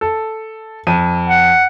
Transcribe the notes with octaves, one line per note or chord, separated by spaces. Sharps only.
A4
F2 D#7
F#5